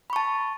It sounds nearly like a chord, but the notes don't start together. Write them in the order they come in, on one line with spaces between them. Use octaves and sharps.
B5 C#6 A5